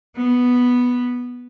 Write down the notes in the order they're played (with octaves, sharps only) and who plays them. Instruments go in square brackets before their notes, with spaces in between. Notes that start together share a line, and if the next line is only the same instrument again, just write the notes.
[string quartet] B3